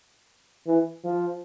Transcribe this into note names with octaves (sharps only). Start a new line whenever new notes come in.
E3
F3